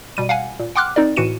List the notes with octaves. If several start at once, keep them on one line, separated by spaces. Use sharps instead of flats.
B2 G3 D#7
F5 F#5 G#5
A#2
F#5 G5 C6 D6 F6 F#6
C4 D#4 A#4 D5
A2 E3 F#4 C#7 D#7 E7